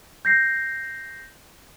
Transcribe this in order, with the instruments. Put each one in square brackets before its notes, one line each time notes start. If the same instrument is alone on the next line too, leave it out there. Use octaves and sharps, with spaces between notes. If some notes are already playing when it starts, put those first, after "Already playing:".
[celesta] G6 A#6 C7